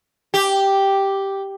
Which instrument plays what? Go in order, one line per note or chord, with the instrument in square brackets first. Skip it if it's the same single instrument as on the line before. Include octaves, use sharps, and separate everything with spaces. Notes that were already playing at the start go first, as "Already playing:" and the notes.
[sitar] G4